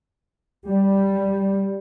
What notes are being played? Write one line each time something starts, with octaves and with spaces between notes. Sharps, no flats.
G3